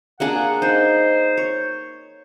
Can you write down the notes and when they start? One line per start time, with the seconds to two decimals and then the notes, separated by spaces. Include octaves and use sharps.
0.20 A#3 D4 G#4 F#5
0.62 D#4 C5
1.37 C#5